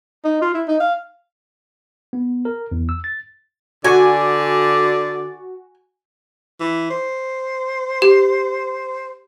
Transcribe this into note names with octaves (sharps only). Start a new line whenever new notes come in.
D#4
F4
E4
D#4
F5
B3
A#4
E2
E6
A6
D3 F#4 D5 G#5
E3
C5
G4